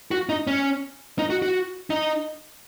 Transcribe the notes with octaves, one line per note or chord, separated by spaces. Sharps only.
F#4
D#4
C#4
D#4
F#4
F#4
D#4